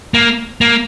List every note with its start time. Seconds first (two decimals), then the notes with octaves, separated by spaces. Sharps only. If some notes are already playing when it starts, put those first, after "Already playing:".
0.14 A#3
0.61 A#3